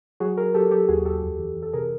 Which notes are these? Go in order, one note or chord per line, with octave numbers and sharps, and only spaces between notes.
F#3 F#4 G#4
F#3 G#4 A#4
F#3 G4 A4
F#3 G4 A4
D#2 F#4 G#4
D#2 G4 A4
F2
E3
E3
A4
C3 G#4 A#4